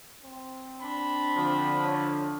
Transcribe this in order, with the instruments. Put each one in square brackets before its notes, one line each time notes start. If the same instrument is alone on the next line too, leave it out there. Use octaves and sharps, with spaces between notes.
[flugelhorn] C4
[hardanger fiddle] D4 [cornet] B5
[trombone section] D3 F3
[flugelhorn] C#5